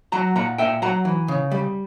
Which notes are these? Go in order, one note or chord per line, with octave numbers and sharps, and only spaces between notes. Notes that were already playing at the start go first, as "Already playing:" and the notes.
F#3 F#5 A#5
A#2 F#5 A#5
A#2 E5 G5
F#3 F#5 A#5
E3
C#3
G3